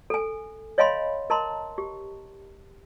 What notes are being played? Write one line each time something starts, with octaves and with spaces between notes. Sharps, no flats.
A4 G#5
C#5 D#5 F5 G#5 B5 C6
A#4 D#5 A5 A#5 C6
G4